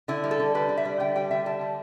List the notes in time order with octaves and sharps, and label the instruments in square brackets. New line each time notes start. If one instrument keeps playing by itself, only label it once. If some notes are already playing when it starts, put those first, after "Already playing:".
[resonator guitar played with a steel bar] D3 E4
G3
A4
D3
G3 B4
D3
E5
G3
D3 G5
G3 G5
D3 E5
G3 A5
D3